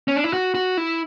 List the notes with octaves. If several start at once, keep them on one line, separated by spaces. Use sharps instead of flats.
C#4
D4
E4
F#4
F#4
E4